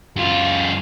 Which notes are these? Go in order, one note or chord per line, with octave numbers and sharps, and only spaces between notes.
F#2 F4